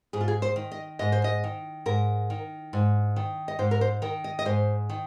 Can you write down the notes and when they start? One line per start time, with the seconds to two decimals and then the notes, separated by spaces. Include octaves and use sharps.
0.13 G#2 G#4
0.21 F4
0.28 G#4
0.42 C5
0.56 D#3
0.72 D#5
0.99 G#2 D#5
1.12 C5
1.24 D#5
1.44 D#3
1.86 G#2 A#4
2.30 D#3
2.73 G#2
3.16 D#3
3.48 D#5
3.59 G#2 C5
3.71 A#4
3.81 C5
4.02 D#3 A#4
4.24 D#5
4.39 D#5
4.45 G#2 C5
4.90 D#3